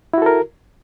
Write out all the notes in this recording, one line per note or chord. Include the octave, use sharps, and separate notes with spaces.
E4 F#4 A4 A#4